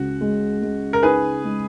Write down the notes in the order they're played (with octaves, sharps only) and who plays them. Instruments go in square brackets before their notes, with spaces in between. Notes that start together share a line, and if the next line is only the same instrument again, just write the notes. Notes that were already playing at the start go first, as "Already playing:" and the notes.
Already playing: [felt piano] C#2 [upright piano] F#4
[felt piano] G#3
G#3
[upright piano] A#4
[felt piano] D#4 [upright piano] G#4 B4
[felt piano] G#3